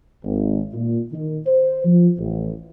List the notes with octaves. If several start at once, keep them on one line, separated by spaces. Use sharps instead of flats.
G#1
A#2
D#3
C5
F3
A1